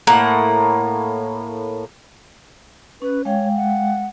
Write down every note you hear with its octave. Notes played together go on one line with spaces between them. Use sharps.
A2 A#3 F#5
C#4 B4
G#3 C#5 F5 G5
F#5